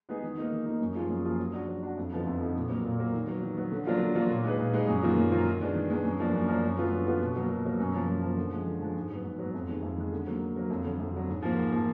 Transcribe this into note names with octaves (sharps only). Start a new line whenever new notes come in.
G#3 B3 D#4 G#4
D#3
A#3 D#4
D#3
A#3 D#4
F#2
F3 A#3 F4 G#4
F#2
F3 A#3 F4 G#4
F#3
D4 F#4
F#3
D4 F#4
F2
D3 F3 B3 D#4
F2
D3 F3 B3 D#4
A#2
F#3 A#3
A#2
F#3 A#3
D#3
F#3 B3
D#3
F#3 B3
D3
F#3 A#3 D4 F4
D3
F#3 A#3 D4 F4
A#2
G#3 D#4 G#4 B4
A#2
G#3 D#4 G#4 B4
F#2
D#3 F#3 A#3 F4
F#2
D#3 F#3 A#3 F4
D#3
G#3 B3 D4
D#3
G#3 B3 D4
F#2
F3 A#3 D4
F#2
F3 A#3 D4
F#2
D3 F#3 B3 F4
F#2
D3 F#3 B3 F4
B2
F#3 A#3
B2
F#3 A#3
F#2
F3 A#3
F#2
F3 A#3
D3
F3 G#3
D3
F3 G#3
G#2
F#3 B3
G#2
F#3 B3
F2
D#3 G#3
F2
D#3 G#3
D3
F#3 A#3
D3
F#3 A#3
F2
D3 F#3
F2
D3 F#3
G#2
F3 A#3
G#2
F3 A#3